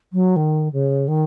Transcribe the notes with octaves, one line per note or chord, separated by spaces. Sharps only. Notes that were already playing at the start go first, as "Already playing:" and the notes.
F#3
D#3
C#3
D#3